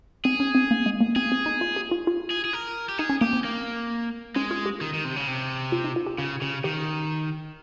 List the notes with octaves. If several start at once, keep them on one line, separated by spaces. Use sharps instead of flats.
C4 G#4
C#4
C4
A#3
G#3
A#3
C4 G#4
C4
D#4
F4
G4
F4
F4
G#4
G#4
A#4
G4
D#4 G#4
C#4
A#3 G4
C4
A#3
G#3 C#4
F4
G4
D#3
D#3
C3
C#3
C3
F4
D#4
F4
G4
C#3 F4
C#3 G4
D#3 G4